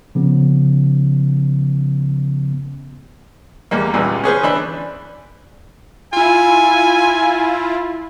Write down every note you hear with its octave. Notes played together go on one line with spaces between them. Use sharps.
C#3 F3 B3 C#4
E2 G3 A#3
C#2 A#2 E3 G3
C#4 G#4 B4 C5
E3 D4 B5
E4 F4 G#5